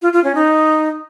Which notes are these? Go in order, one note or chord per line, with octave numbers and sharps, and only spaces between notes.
F4
F4
C#4
D#4